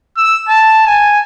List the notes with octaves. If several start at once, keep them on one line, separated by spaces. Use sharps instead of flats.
E6
A5
G#5